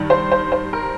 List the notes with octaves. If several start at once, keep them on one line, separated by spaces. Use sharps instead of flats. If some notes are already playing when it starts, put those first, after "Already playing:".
Already playing: G2 D#3
C5
C5
C5
A#4